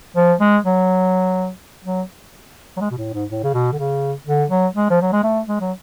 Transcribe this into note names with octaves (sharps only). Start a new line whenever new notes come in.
F3
G#3
F#3
F#3
F#3
G#3
B2
A2
G#2
A2
C#3
B2
D3
C#3
D3
F#3
G#3
F3
F#3
G#3
A3
G#3
F#3